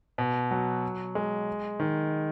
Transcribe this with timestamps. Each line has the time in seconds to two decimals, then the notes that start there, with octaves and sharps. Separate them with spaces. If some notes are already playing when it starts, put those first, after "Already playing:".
0.18 B2
0.51 F#3
1.15 G#3
1.80 D#3